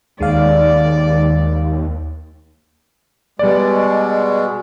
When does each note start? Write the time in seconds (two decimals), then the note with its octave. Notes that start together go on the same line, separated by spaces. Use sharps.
0.20 D#2 D#3 G#3 D5 F5
3.39 B2 G3 G#3 D5